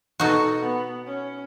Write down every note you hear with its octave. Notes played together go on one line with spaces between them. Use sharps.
B2 D#4 F#4 A4
B3
C#4